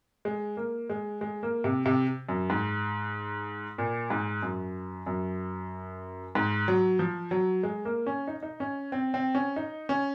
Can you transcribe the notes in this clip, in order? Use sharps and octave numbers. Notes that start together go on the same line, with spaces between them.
G#3
A#3
G#3
G#3
A#3
C3
C3
F#2
G#2
A#2
G#2
F#2
F#2
G#2
F#3
F3
F#3
G#3
A#3
C#4
D#4
D#4
C#4
C4
C4
C#4
D#4
C#4